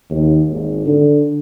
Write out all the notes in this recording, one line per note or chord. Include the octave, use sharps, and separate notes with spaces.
D#2
G#1
D3